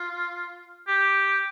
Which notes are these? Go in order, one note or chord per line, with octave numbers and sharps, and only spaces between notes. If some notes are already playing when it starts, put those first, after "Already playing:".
Already playing: F4
G4